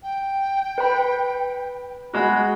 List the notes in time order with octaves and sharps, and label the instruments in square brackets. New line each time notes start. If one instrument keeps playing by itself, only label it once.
[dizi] G5
[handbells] B4 B5
[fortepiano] G#3 F#4 [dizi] B5